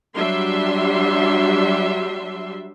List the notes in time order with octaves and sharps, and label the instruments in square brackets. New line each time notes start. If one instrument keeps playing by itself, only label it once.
[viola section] F#3 G3 D4 E5 C6